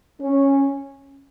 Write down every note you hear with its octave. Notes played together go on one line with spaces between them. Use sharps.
C#4